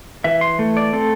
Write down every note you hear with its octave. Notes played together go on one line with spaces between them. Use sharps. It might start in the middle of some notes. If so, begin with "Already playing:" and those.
E3 E5
C6
A3
D5
C4 A4